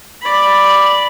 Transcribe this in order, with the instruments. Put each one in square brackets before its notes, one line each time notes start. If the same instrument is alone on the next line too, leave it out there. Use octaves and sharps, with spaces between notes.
[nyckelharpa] D5 B5